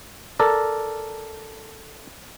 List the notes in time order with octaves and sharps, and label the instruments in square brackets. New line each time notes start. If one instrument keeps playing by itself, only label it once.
[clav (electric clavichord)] A4 A#4 D5